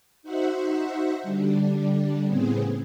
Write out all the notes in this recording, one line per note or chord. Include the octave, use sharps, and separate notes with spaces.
D#4 F#4 C5 E5 F#5
D3 G3 D4
A2 C#3 B3 C4 G#4